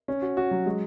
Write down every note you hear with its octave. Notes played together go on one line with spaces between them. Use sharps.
C#4
F#4
F#4
F#3
G#3